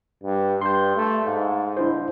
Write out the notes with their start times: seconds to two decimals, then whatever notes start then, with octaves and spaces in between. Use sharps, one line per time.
0.23 G2
0.61 G2 C6 G6
0.96 A3
1.27 G#2 F5
1.77 D4 E4 C5